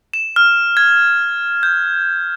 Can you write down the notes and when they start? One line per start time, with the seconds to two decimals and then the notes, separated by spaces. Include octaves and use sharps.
0.14 E7
0.36 F6
0.77 G#6
1.63 G6